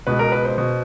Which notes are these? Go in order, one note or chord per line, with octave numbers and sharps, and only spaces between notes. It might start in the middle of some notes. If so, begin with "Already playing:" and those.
C#2 B2 B4
A#4
B4
C5
B2